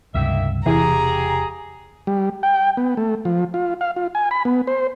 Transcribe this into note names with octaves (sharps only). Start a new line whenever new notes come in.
C#2 G2 C3 D#3 A#3 E5
E1 C3 E3 F4 G4 G#4 A#5
G3
G5
B3
A3
F3
F4
F5
F4
G#5
B5
B3
C5